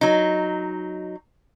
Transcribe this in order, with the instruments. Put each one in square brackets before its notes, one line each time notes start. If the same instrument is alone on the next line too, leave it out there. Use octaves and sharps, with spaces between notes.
[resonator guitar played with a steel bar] F#3 D#4